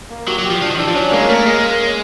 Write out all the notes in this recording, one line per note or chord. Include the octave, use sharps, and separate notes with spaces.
A#3
F#3 G4
F#3
G4
F3
F3 D4
D#3
E3 D4
F3
F#3 C#4
G#3 A#3
A3 A#4
G#3 D#5
A#3
C#4